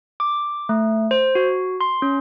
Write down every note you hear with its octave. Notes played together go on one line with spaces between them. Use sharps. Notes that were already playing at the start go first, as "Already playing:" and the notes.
D6
A3
C5
F#4
C6
C#4